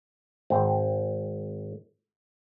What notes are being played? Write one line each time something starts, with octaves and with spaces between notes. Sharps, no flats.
G#1 C4